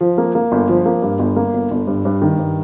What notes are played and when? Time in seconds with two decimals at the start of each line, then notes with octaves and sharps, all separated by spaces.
0.01 F3
0.18 A#3
0.35 A#3
0.52 G1
0.69 F3
0.86 A#3
1.02 G2
1.19 G1
1.36 A#3
1.54 G1
1.71 G1
1.87 G2
2.05 G2
2.22 D#3
2.39 G2